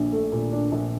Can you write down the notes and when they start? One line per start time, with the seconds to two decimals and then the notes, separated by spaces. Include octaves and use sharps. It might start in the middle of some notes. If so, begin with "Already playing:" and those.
Already playing: A#1 A#2 D4
0.12 A3
0.32 A#2
0.52 D4
0.72 A#1